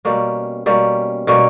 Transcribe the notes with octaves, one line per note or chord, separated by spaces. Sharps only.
B2 G3 A#3 C#4
B2 G3 A#3 C#4
B2 G3 A#3 C#4